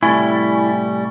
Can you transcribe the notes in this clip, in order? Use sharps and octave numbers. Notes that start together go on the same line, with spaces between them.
A2 C3 G3 E4 G#5 C#6 A6